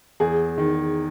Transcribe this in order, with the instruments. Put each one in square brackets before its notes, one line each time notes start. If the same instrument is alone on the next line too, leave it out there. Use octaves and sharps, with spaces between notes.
[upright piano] E2 G#4
D#3